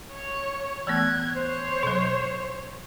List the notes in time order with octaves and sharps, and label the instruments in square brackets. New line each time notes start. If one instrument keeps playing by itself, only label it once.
[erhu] C#5
[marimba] E3 A3 B3 [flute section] F#6 [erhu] G#6
[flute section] C5 [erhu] C#5
[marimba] B2 F#3